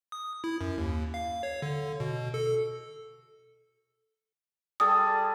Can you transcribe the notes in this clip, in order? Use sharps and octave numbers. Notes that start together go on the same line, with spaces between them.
D#6
E4
F#2
D#2
F5
C#5
D3
B2
A4
G3 G#4 A4 D#6